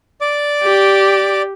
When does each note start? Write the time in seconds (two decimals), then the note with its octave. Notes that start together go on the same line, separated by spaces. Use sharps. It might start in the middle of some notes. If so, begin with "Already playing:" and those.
0.21 D5 D6
0.63 G4